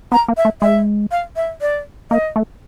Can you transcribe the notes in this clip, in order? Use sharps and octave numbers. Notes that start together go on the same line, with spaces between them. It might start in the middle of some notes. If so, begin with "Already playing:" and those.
B3 A#5
A#3
E5
A3
G#3 E5
F5
E5
D5
A#3 D#5
A3